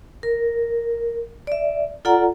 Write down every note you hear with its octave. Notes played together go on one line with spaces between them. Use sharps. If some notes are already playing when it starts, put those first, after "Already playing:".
A#4
D5 E5
F4 A4 D5 F#5 A#5